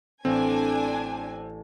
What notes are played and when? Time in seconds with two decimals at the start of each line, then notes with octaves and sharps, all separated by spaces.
0.25 A1 C4 D4 G#5